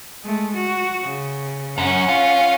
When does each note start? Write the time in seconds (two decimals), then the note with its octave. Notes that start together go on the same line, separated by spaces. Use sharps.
0.24 G#3 A3
0.55 F#4
1.03 C#3
1.78 F#2 C#4 F#5
2.09 F4